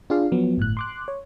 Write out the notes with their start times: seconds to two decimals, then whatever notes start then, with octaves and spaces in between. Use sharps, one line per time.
0.10 D4 F4 G#4 D5 F5
0.32 F3 F#3 B3
0.57 G1 A2 F#6
0.77 C6 D6 F#6
1.08 C#5